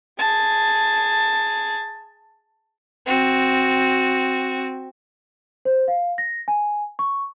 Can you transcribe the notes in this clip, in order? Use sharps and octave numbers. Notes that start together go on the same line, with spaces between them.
G#4 A5
C4 F#4
C5
F5
A#6
G#5
C#6